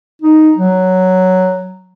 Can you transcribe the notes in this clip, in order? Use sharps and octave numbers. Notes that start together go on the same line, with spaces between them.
D#4
F#3